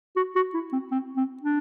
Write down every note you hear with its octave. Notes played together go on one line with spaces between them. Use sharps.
F#4
F#4
E4
C4
C4
C4
D4